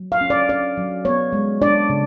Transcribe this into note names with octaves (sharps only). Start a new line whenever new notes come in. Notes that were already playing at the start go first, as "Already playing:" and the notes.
Already playing: F#3
F5
C#4
D5
C#4 D5
F#3
B3 C#5
G#3
D4 D5
C#3